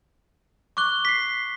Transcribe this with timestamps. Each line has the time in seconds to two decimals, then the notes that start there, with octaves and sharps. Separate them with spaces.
0.77 C#6 D6 F#6 G7
1.05 B6 C7